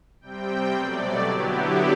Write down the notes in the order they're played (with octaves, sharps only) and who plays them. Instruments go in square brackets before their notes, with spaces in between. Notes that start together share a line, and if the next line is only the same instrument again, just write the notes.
[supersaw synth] C3 G3 C4 G5
B2 F#3 A3 D5
D3 F#3 B3 E4 G4